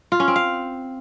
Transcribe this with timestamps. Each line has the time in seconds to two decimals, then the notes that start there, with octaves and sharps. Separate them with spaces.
0.12 F4
0.20 C#4
0.28 C4
0.36 F5